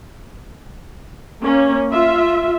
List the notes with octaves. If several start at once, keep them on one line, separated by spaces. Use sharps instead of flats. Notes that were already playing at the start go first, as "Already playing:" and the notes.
A#3 C#4
F4 E5